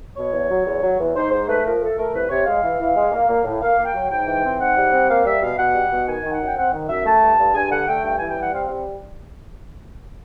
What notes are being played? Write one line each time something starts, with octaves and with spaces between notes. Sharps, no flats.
B2 C#5
E2
F#3
E2
F#3
E2
G#2 C5
G#2 C5
A3 B4
F3 A#4
A3 A4
A3 A#4
C2 B4
C3 C#5
G#3 F5
E3
E3
G#3
A#3
A#3
A2
A#3 F5
A#3
G5
F#3
G#2 G5
E3
C4
G#2 F#5
G3
C4
A#3 F5
G3 E5
B2 F5
B2 F#5
G3
B2
D#3 G#5
D#3
F#5
F#2
G5
C4 F#5
D#3
F#2 E5
A3 A5
G2
G2
G2 G#5
D3 F#5
A3 G5
G2 G5
E3 G#5
G5
G3 F#5
C4 F5
G3